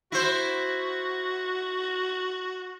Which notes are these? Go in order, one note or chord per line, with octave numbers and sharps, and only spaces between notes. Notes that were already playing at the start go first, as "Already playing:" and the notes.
E4 F#4 C5